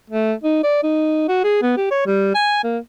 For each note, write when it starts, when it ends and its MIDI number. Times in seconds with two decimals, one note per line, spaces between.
0.10 0.33 57
0.43 0.61 63
0.63 0.82 74
0.83 1.24 63
1.28 1.42 66
1.44 1.60 68
1.62 1.72 59
1.77 1.89 67
1.91 2.05 73
2.06 2.32 55
2.35 2.61 80
2.63 2.78 58